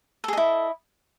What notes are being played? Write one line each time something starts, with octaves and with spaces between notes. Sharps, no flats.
E4 G#4 A4 D#5